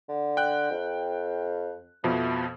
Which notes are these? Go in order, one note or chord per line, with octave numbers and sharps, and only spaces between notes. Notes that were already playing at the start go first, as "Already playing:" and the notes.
D3
G5 F#6
F2
F2 B2 F3 A3